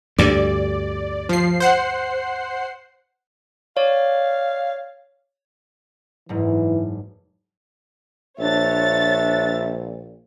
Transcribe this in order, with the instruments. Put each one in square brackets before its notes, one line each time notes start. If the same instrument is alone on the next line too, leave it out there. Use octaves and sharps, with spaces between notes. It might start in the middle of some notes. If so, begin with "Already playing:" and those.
[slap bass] D2 G2 [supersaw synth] D5
[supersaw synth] F3 C7
C5 F#5 C7
[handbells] C#5 D5 [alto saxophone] F5
[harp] F#1 G#2 [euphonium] E3
[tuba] A#1 [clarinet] D4 [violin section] C#5 A6 [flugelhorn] E5